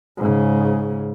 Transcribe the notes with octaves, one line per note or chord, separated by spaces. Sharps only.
G#2 C#3